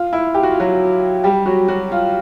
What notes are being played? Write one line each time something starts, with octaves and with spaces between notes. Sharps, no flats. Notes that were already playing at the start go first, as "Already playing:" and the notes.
Already playing: F4
E4
G4
F#4
F4
F#3 F#4
G3 G4
F#3 F#4
F#3 F#4
F4